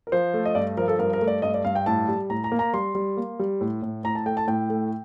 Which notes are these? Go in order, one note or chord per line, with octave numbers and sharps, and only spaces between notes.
A#4
F3 C5
A3
D#5
G2 D5
F3 A#4
A4
G2 A#4
A#4
A3
D5
G2 D#5
D5
G2 F5
G5
A2 A5
G3
A2 A#5
A#5
A#3
A#5
G3 C6
G3
A#3
G3
A2
A2
A2 A#5
A5
A3 G5
A5
A2 G5
A3